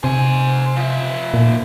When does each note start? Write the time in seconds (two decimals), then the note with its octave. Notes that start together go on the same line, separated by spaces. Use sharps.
0.04 C3 C5 G#5
0.76 F3 E5
1.34 A#2